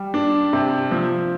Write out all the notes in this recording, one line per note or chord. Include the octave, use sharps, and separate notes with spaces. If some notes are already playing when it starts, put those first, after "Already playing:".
Already playing: G3
D4
C3
F3